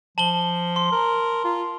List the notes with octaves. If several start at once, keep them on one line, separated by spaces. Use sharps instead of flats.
F3 A5 F#7 G7
C6
A#4
F4